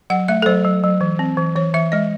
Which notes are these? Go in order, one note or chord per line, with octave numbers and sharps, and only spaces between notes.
F#3 F#5
A3 E5
A4
F#3 C5
F#3
F#3
E3
C4
E3
E3 C#5
E3 E5
G#3 D#5